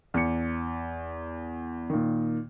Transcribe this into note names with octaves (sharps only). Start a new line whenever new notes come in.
E2 C#7
A#2 D#3